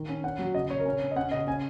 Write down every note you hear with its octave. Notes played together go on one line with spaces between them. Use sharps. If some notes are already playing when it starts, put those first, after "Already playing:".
Already playing: D#3
C#4
C#4 F#5
F#3
C#3 D#5
C#3 C#5
A#4
C#4 C#5
C#4
D#5
C#4 F#5
C#3 D#5
C#4 G#5